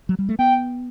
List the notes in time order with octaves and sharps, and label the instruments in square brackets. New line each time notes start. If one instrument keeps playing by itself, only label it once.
[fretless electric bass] F#3
G3
A3
[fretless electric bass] B3 [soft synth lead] G5